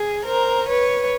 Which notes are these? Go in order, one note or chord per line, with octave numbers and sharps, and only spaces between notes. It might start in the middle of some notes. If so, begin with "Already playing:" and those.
Already playing: G#4
A#4 C5
B4 C#5